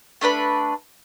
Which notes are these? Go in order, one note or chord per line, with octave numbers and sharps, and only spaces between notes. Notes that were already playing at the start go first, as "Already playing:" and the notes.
A3 D4 B4 B5